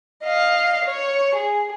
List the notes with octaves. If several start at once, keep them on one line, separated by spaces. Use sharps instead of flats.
D#5 F5
C#5
G#4